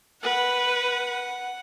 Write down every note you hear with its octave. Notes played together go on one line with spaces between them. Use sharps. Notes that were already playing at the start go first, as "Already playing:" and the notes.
B4 F#5